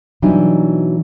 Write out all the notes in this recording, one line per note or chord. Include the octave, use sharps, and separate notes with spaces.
B2 E3 F#3 G3 D4 D#4